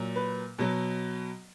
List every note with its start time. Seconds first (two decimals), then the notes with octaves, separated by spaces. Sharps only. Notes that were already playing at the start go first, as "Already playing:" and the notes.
Already playing: A#2 F#3
0.16 B4
0.58 B2 F#3